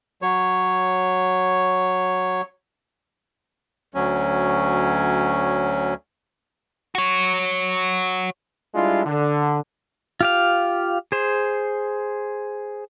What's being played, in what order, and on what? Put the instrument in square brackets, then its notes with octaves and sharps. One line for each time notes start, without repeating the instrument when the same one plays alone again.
[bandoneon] F#3 C#5
D2 F#3 C#4
[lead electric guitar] F#4 C#5
[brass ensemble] G3 G#3 D4 E4 F4
D3
[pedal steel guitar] F4 G4 F5
G#4 C5